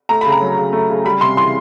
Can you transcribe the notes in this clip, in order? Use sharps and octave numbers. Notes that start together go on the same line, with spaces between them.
A3 A#5
C#3 B5
A#5
F#3
C#3
A3
C#3
G3 B5
C3 C6
E3 C6